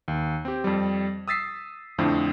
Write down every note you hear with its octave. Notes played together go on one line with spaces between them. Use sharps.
D#2
C4 G4
F2 G3
D#6 E6 A6 B6 C7
F2 A2 D3 F3